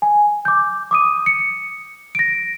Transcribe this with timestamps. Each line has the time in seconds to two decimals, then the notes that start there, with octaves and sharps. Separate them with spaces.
0.02 G#5
0.45 D6 G6
0.91 D6 D#6 D#7
1.26 C#7
2.15 A#6 D7